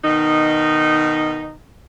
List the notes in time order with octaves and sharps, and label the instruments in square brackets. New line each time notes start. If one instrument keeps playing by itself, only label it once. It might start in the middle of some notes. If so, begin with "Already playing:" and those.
[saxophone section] B2 D#3 D#4